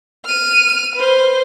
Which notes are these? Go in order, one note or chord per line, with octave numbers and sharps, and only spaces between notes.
F6 D#7
B4 C5